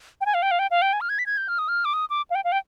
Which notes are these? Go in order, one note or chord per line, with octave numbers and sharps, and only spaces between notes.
G5
G#5
F5
G5
F5
G5
F5
G5
G#5
F6
G#6
B6
G#6
G6
F6
D#6
F6
D6
D#6
D6
F5
G5
F5
G5